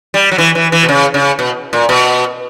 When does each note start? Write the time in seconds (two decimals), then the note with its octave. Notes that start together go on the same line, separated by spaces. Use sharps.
0.14 G3
0.31 F#3
0.38 E3
0.55 E3
0.72 E3
0.83 B2
0.89 C#3
1.14 C#3
1.39 B2
1.73 A#2
1.89 B2